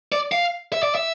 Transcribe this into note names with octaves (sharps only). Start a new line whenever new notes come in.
D5
F5
E5
D5
E5